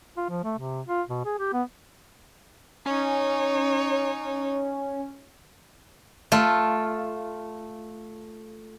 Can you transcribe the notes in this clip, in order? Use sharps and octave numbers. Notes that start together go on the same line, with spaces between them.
F4
F3
A3
C3
F4
B2
G#4
G4
B3
C#4 D#4 C#5
A3 F4